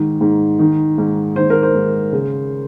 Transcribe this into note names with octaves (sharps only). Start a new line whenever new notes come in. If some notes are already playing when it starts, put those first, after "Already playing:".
Already playing: G#2 D#3
G#2
D#3
G#2
D#3 C5
A#4
C5
G#2
C#3